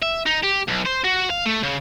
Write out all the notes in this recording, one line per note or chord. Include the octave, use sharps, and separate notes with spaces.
E5
D#4
G4
B1
C5
F#4
F5
A3
C#3